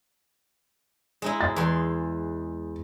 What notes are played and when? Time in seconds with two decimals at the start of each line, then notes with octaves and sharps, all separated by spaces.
1.22 G#3 D#4 E4
1.41 A6
1.56 E2 C6